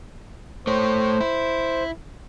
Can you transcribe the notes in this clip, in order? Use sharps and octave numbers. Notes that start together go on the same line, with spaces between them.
A3 C5 C#5
E4